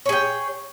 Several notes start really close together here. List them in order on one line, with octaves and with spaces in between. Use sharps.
C#5 G#4 G5